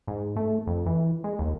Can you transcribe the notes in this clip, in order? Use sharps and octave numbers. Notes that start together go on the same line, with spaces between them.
G#2
A3
F2
E3
G#3
D#2